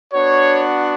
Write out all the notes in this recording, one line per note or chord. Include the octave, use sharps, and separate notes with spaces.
B3 D4 F#4 C#5